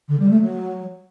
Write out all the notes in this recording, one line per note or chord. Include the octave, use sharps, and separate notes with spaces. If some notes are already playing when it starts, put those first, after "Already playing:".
D3
G3
A3
F#3